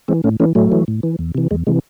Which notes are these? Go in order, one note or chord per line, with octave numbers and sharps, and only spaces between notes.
E3 G#3 C4
A2 A3 C#4
E3 A3 C#4
A2 F#3 A3
E3
A2
E3
E2
C3 E3
E2 G#3
C3 E3 G#3